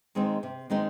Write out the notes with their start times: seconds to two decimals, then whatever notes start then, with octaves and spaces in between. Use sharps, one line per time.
0.15 D#3 G#3 C4 D#4
0.43 C3
0.70 D#3 G#3 C4 D#4